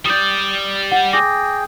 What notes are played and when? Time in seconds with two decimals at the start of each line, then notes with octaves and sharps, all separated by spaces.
0.06 G3 D5 D#6 G6
0.92 F#5
1.13 G#4 G5 D6 A#6